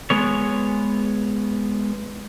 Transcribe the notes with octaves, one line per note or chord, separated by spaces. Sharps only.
G#3 B3 C#5